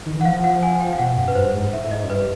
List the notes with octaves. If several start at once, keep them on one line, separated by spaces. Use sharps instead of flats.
D#3
E3
F#5
F3 F5
F#5
G#5
G5
F5
B2 F#5
F#2
B4
G2 C5
G#2
A2 E5
G#2 D#5
F#2
G2 B4